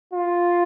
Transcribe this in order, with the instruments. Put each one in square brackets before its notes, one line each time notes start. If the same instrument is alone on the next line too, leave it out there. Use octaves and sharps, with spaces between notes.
[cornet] F4